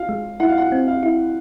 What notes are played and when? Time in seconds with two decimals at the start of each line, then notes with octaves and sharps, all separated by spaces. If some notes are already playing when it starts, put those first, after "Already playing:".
Already playing: F4 F5
0.09 G#3
0.40 E4 F#5
0.49 F5
0.58 F#5
0.72 C4
0.88 F5
1.03 E4